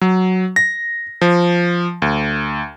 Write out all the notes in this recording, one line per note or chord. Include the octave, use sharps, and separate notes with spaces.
F#3
A#6
F3
D2